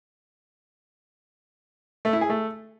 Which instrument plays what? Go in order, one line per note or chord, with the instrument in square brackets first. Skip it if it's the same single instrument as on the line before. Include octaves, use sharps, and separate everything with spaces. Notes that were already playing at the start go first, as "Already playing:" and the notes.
[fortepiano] A3
E4
G#4
A3